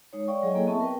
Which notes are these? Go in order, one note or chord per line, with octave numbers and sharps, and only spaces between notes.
G#3 D#4 C#5
C#5 D5 F5 G5 C#6
F#3 G#4 C#5 D#5 G5 G#5
A#3 E4 G#4 A4
B3 C4 E5 A5 C#6
A#4 B4 G5